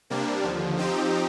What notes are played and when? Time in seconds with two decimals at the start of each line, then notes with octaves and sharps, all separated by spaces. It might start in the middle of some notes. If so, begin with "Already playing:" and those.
0.10 C3 G3 A#3 D4
0.43 D#2 D3 F3
0.77 F3 C4 D#4 G4